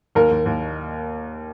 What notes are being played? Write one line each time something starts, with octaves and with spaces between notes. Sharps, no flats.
D#2 A#4
D#2
D#2